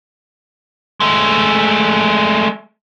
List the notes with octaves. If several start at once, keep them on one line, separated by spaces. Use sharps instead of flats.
G#3 A3